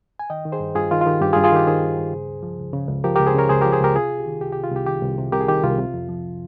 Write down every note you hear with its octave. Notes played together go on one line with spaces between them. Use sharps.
G#5
D#3 D#5 G5
D#3
G#4 C5
G2
G2 F4 G#4
D#3 F4
F4
D#3 G4
G2 G4
F4 G#4
G2
F4 G#4
D#3 G4
D#3 G#4 C5
G2
G2
C#3
C#2
F3
C#2
C#3
C#2
F3 G4 A#4
G4 A#4
C#2
G#4 C5
C#3 A#4 C#5
C#2 G#4 C5
G4 A#4
F3
G#4 C5
C#2 G4 A#4
C3 F4 G#4
C2
G4
D#3
C2 G4
G4
C3
F4
C2 G4
D#3 G4
C2
C3
C2 G4 A#4
G#4
D#3 G4
C2 F4
C3
F2
F3